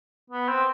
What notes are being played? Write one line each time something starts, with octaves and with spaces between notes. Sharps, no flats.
B3
C4